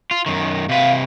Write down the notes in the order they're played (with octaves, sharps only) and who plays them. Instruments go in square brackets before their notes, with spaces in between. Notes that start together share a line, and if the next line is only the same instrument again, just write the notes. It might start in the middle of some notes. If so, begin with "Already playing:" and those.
[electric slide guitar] F4
F#2 D#3
[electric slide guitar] C3 B4 [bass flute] F5